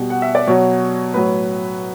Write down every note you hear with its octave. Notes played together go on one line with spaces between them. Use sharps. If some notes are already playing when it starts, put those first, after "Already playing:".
Already playing: B2 G3
F#5
E5
D5
B2 F#3 C#5
A2 F#3 B4